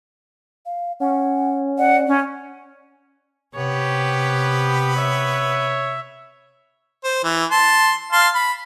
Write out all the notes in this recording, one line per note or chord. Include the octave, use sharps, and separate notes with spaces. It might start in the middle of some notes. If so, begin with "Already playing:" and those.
F5
C#4 F#5
D5 F#5
C#4
C3 B3 G4 B4 C#5
C#5 E5
C5
E3
A5 C6
F5 A5 C6
B5